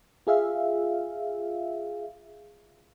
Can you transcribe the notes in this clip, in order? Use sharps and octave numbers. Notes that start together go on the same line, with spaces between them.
F4 G#4 E5 F5